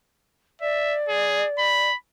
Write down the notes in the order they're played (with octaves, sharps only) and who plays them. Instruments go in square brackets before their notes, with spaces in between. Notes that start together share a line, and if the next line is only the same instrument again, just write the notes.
[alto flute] D5 [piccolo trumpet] E5
[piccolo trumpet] G#4
B5